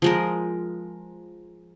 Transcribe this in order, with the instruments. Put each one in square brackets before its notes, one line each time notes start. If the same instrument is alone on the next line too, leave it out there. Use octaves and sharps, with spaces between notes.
[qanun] F3 G#3 A#4